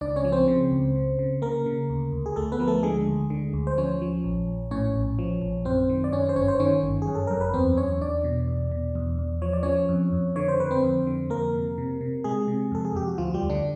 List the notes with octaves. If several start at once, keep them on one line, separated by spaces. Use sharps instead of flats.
C#2 D4 D5
C#4 C#5
F3
C4 C5
C#3
C#2
C#3
C#3
C#3 A#3 A#4
C#3
D2
D2
G#4
D2 A3 A4
B3 B4
F3 A#4
A3 A4
D3 G#3 G#4
D2
D3
D2
C5
F3 C#4 C#5
F3
A#1
A#1
A2 C#4 C#5
A#1
F3
A#1
F#2 C4 C5
D#3
D5
F#2 C#4 C#5
C5
G1 C#4 C#5
C5
D#3 C#4 C#5
G1
G#4
F#2
A4
F#2 A#4
B4
E2 C4 C5
E2 C#4 C#5
E2 D4 D5
B2
E2
B2
E2
E2
F3 C#5
D5
F3 C#4 C#5
F2
F2
D3 C#5
C5
D3 B4
C4 C5
F2
D3
F2 A#3 A#4
C3
C3
C3
C3 G#3 G#4
C3
F2 A4
G#4
F2 G4
F#4
D2 F3 F4
G3 G4
D2
D3 D4